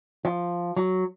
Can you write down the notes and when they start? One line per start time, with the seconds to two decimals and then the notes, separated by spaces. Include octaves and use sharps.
0.25 F3
0.77 F#3